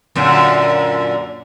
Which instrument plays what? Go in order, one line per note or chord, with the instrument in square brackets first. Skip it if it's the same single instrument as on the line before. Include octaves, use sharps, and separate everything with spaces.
[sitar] F#2 A#2 D3